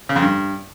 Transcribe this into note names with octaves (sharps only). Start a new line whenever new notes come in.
C#3
F2
G2